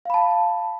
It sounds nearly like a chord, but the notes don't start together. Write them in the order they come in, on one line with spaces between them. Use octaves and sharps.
F5 B5 A5